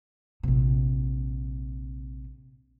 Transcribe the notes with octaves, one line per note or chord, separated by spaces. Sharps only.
A#1 C3